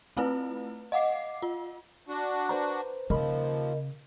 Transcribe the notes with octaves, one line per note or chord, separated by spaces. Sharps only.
A3 C4 E4 F4 B4
D#5 F5 F#5 D6 C7
F4
D4 F#4
B4 C5 A#5
D#2 C#3 F3 A#4 D#5 B5